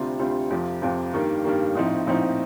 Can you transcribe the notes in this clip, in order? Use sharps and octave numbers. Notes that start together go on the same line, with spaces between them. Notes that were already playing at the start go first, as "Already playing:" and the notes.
Already playing: D2 C3 G3 C4 F4
D2 C3 G3 C4 F4
F2 C3 F3
F2 C3 F3
G2 D#3 G3 A#3
G2 D#3 G3 A#3
A#1 A2 F3 C4 D#4
A#1 A2 F3 C4 D#4